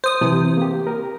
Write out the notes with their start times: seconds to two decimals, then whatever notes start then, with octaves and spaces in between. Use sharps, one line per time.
0.04 C5 D#6
0.21 C3 E3
0.57 A#3 G4
0.87 A#4